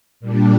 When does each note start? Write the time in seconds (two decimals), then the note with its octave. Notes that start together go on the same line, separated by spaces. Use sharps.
0.20 A#2 G3 D4